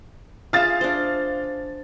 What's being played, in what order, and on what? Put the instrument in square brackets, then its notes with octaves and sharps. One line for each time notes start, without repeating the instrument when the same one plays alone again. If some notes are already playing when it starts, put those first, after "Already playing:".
[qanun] F4 G#4 E5 [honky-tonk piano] F5 A6
[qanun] D4 C5